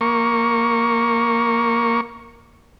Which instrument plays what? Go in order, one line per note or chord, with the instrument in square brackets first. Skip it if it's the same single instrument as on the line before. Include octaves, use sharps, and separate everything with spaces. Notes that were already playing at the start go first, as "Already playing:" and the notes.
[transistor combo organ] A#3 C#6